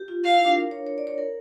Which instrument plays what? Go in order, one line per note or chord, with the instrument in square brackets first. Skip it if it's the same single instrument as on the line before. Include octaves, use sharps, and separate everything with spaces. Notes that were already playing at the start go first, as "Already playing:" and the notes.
Already playing: [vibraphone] G4
F4
[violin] F5
[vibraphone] E4
D4
A#4
C#5
C#5
D5
C#5
A#4